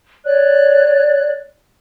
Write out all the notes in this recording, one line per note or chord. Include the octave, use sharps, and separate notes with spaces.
C#5 D5 F#6